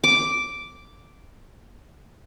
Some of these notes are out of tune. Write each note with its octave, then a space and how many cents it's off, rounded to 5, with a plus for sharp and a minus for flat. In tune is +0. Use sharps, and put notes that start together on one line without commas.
D6 -5